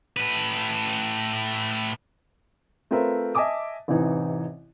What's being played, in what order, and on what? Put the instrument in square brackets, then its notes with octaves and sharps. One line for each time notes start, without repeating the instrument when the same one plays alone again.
[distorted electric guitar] A2 B4
[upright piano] A3 C4 F4 A#4 B4 E5
D#5 E5 G#5 A5 D6 D#6
A1 C3 E3 D#4